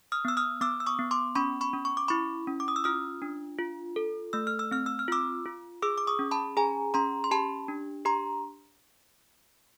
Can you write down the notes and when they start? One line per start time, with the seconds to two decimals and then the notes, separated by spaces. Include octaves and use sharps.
0.12 D#6 F6
0.25 B3 E6
0.37 D#6 F6
0.61 B3 D6 E6
0.80 E6
0.86 C#6 D#6
0.99 B3
1.11 C6 D6
1.35 C#4 B5 C#6
1.61 B5 C#6
1.73 C#4
1.85 C#6
1.97 D6
2.08 E4 B5 C#6
2.47 C#4
2.60 D6
2.68 D#6
2.76 E6
2.84 F4 D#6 F6
3.22 D4
3.59 F4
3.96 A4
4.33 A3 E6
4.47 F6
4.59 E6
4.71 C4 F6
4.86 E6
4.99 F6
5.08 F4 D6 E6
5.46 F4
5.82 G#4 D6 E6
5.98 D6
6.07 C#6 D#6
6.19 C#4
6.31 A5 B5
6.57 G#4 G#5 A#5
6.94 C#4 A#5 C6
7.24 C6
7.31 G4 A5 B5
7.68 D4
8.05 G4 A#5 C6